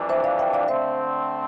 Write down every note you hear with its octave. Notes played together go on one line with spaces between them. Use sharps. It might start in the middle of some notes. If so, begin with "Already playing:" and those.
Already playing: F2 E3 G3 D4
C5 E5
D5 F5
E5 G5
D5 F5
D3 A3 C4 C5 E5